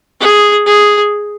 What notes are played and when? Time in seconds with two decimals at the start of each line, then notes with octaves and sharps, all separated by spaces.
0.21 G#4
0.66 G#4